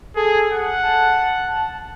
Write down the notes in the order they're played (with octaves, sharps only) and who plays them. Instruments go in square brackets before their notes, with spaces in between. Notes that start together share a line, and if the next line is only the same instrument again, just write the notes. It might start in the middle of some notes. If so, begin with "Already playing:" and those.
[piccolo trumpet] G#4 [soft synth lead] A4
[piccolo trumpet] F#5
[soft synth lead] A5